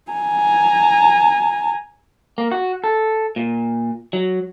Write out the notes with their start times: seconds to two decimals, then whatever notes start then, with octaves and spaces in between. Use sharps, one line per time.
0.12 G#5 A#5
2.38 A#3
2.52 F#4
2.84 A4
3.36 A#2
4.13 F#3